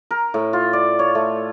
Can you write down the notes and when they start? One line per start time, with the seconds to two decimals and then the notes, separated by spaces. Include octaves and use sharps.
0.11 A#4
0.34 A2
0.53 F4
0.73 D5
0.99 C#5
1.15 A3